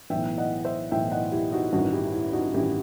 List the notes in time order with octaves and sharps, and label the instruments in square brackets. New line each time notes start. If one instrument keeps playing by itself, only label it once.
[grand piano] B1 A2 E3 E5 G5
D#5 F#5
C5 E5
B1 A2 E3 E5 G5
D#5 F#5
E4 G4
D#4 F#4
A1 G2 D#3 D#4 F#4
E4 G4
E4
D#4 F#4
A1 G2 D#3 E4 G4